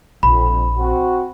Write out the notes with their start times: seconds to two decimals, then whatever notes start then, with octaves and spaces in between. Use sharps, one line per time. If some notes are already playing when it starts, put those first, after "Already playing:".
0.23 A#1 F2 B5
0.78 C4 F#4